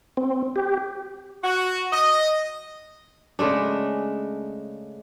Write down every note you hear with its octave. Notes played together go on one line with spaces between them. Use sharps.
C4
G4
F#4
D#5
C#3 G#3 A3 D4